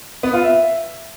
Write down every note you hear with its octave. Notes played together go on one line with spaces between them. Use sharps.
B3
F4
E5